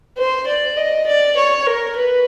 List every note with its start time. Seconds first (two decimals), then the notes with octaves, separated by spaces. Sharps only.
0.18 C5
0.47 D5
0.77 D#5
1.07 D5
1.37 C#5
1.67 A#4
1.96 B4